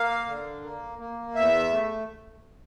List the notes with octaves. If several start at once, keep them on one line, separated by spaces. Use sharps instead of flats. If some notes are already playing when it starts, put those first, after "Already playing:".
Already playing: A#3 F5
D3
A#3
A#3
E2 E5
A3